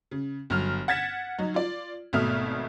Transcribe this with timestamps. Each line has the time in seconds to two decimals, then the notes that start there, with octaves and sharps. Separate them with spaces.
0.11 C#3
0.50 G1 F#3 F6
0.88 F#5 G#6 A6 B6 E7
1.38 F#3 D#4 F#4
1.54 F4 D5
2.13 G#1 B2 A3 E5 D#6 F6